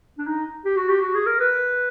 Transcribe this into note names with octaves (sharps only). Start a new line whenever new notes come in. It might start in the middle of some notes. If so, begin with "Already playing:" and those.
D4
D#4
G4
F#4
G4
F#4
G#4
A#4
B4